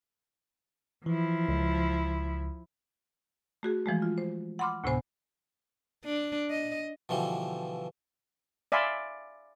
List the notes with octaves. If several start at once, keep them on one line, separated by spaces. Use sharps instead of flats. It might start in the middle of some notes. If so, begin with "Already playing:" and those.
E3 F3 E4
C#2
A3 F#4 G#4
E3 F3 G#3 A3
F4
C5
F#5 B5 C6 D6 F6
D2 A2 C3 B3 C5 G#5
D4
D#5
B2 D3 E3 F3 G3
D5 E5 F5 G#5 B5 C6